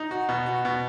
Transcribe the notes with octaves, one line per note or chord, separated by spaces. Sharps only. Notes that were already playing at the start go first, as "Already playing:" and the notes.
Already playing: D#4
F#4
B2
F#4
B2